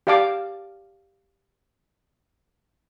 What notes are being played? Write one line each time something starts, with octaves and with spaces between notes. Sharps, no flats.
G4 D5 F5 A5 D6